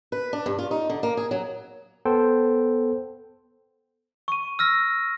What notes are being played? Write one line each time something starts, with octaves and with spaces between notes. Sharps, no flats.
B4
D4
G2
F4
D#4
D3
A#3
G#4
F#3
B3 A4 C5 G5
C#6 D#7
E6 F6 A#6